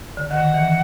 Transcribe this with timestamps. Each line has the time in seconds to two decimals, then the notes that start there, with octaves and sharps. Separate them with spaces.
0.17 D3
0.30 D#3 F#5
0.54 E3